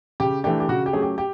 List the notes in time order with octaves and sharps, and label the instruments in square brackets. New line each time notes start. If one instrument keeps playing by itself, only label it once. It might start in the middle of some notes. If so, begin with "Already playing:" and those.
[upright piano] C#3 G4
E3 A3 D4 G4
G4
C#3 F#4
G4
F#3 A3 C#4 G#4
G4
G4